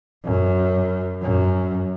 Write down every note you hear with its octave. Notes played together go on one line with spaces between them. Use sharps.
F#2
F#2